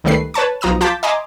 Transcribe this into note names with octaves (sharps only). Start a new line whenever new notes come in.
C#2 D#3 G3 A3 B4 C7
B4 C#5 A5 C#6
B1 F3 A#5 D#6 D#7
F4 A5 D6 G6 A6 B6
D#5 E5 G#5 A#5 C6 D6